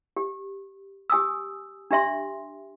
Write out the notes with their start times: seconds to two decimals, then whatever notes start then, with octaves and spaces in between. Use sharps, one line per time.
0.17 G4
1.10 G4 G#5 D#6 E6
1.91 D4 G4 E5 C6